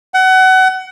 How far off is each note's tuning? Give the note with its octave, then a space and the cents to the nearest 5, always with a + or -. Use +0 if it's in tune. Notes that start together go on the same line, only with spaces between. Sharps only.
F#5 +25